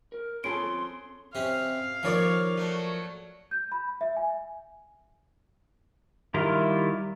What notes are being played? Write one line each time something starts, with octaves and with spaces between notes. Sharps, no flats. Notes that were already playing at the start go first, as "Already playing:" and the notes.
A#4
C4 C#4 F4 G#4 A4 B5 C6 D7
C3 C4 C#4 F5
D#2 F3 A#3 C#5 D5
F#3 A3
G6
B5
E5
G#5
D#3 G3 E4 F4 A#4